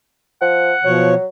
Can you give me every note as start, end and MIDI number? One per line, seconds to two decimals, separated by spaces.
0.42 0.73 53
0.42 1.23 78
0.85 1.14 47
0.85 1.14 53
0.85 1.26 54
0.85 1.14 73